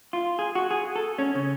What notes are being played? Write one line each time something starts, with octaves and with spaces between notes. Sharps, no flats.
F4
G#4
F#4
G#4
A4
C#4
C#3